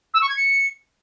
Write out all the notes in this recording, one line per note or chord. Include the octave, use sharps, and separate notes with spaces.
E6
C#6
G#6
C#7